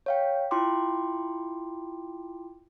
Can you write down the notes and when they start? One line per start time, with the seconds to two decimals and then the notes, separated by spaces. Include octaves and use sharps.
0.06 C#5 F5 G5
0.51 E4 F4 G5 C6 D6